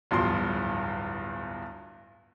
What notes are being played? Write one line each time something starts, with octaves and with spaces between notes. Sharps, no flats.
D1 E2 G2 F3 C6